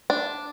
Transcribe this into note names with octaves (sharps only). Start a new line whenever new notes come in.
D4